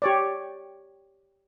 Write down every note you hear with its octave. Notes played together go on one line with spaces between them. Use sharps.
G4 C#5 D5